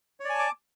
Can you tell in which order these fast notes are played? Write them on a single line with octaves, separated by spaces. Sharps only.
C#5 D5 G#5 A5 D6